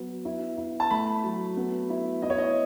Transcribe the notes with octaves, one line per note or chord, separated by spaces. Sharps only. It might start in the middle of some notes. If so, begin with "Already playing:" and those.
Already playing: F#3 B3
E4
E4
A5
A3 B5
F#3
B3
E4
E4 D#5
C#5
D#5